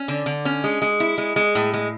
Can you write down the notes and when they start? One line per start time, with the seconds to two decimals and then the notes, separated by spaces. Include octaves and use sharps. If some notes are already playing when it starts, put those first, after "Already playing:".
Already playing: C#4
0.08 D3
0.26 D3
0.45 C#4
0.64 G#3
0.82 G#3
1.00 E4
1.18 G#3
1.36 G#3
1.55 A2
1.74 G#3